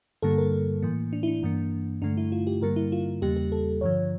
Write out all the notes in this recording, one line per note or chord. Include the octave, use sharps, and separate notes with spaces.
G2 D3 G3 A#3 A4
A#4
A2 E3 A#3
D4
E4
D4
G2 E3 A#3
G2 D3 A3 D4
E4
F4
G4
G2 D3 G3 A#3 A#4
E4
F4
E2 C#3 G3 A#3 G4
G4
A4
G2 D3 F3 C#5